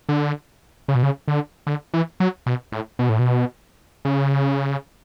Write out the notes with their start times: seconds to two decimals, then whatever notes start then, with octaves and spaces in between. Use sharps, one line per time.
0.09 D3
0.88 C#3
0.95 B2
1.03 C#3
1.28 D3
1.67 D3
1.94 E3
2.20 F#3
2.46 B2
2.72 A2
2.99 B2
3.09 A2
3.19 B2
4.05 C#3